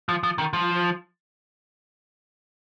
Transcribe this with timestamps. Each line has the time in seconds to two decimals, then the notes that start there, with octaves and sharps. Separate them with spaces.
0.09 F3
0.23 F3
0.38 D#3
0.53 F3